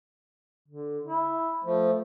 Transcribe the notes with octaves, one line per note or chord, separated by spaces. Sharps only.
D3
E4
F3 A3